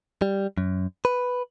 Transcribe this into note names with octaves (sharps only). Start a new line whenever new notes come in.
G3
F#2
B4